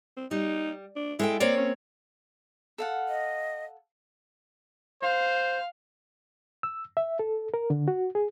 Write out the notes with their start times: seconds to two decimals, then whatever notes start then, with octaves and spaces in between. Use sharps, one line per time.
0.17 C4
0.31 G3 D#4
0.96 D4
1.19 G#3 E4 A4 G5
1.40 A#3 C4 C#5 D5
1.57 C#4
2.78 A4 F5 F#5
3.08 D#5
5.03 C5 F5
6.63 E6
6.97 E5
7.19 A4
7.54 A#4
7.70 D3
7.88 F#4
8.15 G#4